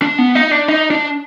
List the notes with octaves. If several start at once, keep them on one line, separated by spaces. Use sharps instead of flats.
D4
B3
D#4
D4
D#4
D4